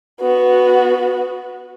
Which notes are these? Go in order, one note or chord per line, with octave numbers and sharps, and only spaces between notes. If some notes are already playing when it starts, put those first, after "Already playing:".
B3 F#4